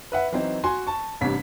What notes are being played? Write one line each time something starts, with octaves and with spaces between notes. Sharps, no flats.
B4 E5 F#5
E3 F#3 C4 D#4
F#4 G#5 C6
A5 C#6
A1 G2 C3 B6